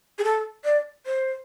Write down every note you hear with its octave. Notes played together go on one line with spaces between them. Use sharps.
G#4
A4
D5
C5